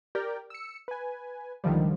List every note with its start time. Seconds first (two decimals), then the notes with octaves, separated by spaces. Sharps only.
0.15 G4 A#4 D5 G5
0.50 E6 C#7
0.88 B4 G#5
1.64 C#2 D3 D#3 F3 G3